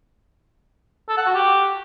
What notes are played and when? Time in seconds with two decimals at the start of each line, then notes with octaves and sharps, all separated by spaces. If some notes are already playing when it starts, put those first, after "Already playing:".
1.09 A4
1.17 F#5
1.26 F#4
1.34 G4